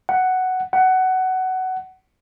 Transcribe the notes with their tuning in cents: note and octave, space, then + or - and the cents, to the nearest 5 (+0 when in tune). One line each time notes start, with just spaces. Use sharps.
F#5 +5
F#5 +15